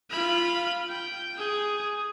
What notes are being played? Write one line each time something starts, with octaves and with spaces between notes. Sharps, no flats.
F4 B5
G5
G#4